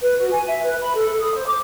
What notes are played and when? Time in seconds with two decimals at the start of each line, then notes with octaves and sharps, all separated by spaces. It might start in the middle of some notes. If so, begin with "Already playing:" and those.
0.01 B4
0.18 F#4
0.32 G#5
0.47 E5
0.64 B4
0.81 B5
0.95 A4
1.19 D#6
1.34 C5
1.47 D6